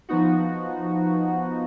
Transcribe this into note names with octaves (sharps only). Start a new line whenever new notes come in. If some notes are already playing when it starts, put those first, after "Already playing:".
F3 B3 D#4 F#4